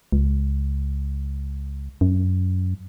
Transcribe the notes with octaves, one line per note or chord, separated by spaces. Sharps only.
C#2
F#2